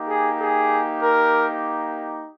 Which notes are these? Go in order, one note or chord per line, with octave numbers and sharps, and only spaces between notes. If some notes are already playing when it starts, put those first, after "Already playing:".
Already playing: A#3 D#4 G4
G#4
G#4
A#4